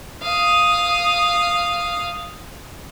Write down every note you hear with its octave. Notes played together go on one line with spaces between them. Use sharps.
F5 D#6